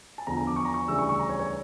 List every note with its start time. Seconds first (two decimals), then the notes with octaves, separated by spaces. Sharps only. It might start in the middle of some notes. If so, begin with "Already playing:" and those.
0.18 A5
0.27 E2 D3 F3 A#5
0.37 A#5
0.47 D6
0.56 C#6
0.65 A#5
0.74 C#6
0.88 D2 C#3 E3 G3 D4 E6
0.99 C#6
1.09 C#6
1.19 A#5
1.29 C#5
1.39 C#5